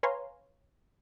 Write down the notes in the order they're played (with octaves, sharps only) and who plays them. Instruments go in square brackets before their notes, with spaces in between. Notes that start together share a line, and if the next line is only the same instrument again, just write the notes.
[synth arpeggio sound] B4 C#5 F5 G#5 A#5 C6